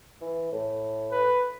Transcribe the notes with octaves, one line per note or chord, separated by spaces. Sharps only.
E3
A2
B4